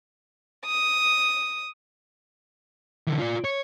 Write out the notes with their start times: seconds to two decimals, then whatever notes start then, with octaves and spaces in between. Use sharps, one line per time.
0.66 D#6
3.07 D3 E3
3.19 F4 D5
3.44 C#5